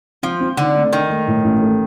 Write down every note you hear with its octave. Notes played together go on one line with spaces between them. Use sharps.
F3 C4
C4
D3 D#4
A3
D#3 D4
A3
A2
A1
A3